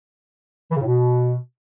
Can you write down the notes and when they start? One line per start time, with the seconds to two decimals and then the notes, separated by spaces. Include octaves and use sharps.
0.71 E3
0.76 C#3
0.81 A2
0.86 B2